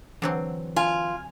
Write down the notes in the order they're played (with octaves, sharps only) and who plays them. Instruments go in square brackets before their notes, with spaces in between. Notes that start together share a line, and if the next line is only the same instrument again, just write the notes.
[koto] D3 F#3 C4 [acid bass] E3
[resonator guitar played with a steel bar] F4 [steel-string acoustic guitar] G#5